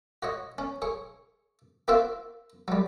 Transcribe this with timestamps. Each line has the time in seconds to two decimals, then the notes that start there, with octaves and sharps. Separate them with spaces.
0.23 F#4 C#5 D#5
0.58 C#4
0.82 G#4 C#5
1.88 A#3 C4 F4 F#4 E5 F5
2.68 F#3 G3